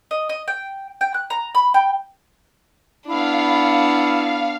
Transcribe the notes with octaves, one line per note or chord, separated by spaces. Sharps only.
D#5
D#5
G5
G5
F#6
A#5
B5
G5
B3 D4 E4 F5